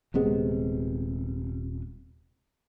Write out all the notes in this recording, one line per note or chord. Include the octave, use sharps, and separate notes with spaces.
D#1 C3 G#3 B3